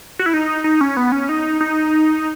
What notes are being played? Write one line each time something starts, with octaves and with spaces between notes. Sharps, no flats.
F#4
E4
D#4
D#4
C#4
B3
C#4
D#4
D#4